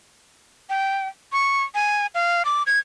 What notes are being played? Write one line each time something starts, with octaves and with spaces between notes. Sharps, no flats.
G5
C#6
G#5
F5
D6
G#6